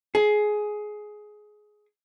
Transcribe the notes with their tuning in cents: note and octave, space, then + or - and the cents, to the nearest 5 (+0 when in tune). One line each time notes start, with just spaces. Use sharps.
G#4 +15